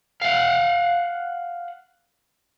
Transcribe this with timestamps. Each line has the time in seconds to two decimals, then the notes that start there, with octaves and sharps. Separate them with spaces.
0.21 F5 F#5